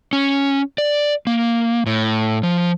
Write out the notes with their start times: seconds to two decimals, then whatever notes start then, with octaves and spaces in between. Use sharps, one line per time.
0.13 C#4
0.78 D5
1.27 A#3
1.86 A2
2.43 F3